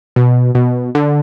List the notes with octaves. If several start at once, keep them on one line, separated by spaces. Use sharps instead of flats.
B2
B2
D3